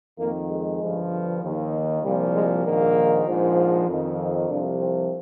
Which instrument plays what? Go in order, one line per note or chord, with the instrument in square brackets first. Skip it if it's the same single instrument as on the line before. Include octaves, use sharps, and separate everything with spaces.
[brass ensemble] F2 D#3 A#3
G#3
G1 G2 F3
D#2 D#3
C2 A#2 F3 G3
G#3
A#1 G#2 D#3 A#3
A#1 G#2 F3
F2 D#3
C2 C3 F3 D4
C4